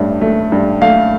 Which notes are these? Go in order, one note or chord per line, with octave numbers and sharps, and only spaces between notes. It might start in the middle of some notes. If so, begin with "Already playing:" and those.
Already playing: A1 G2 A3
A3
G2
A3 F5